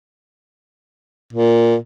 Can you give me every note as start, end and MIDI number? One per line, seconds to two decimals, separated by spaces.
1.33 1.75 46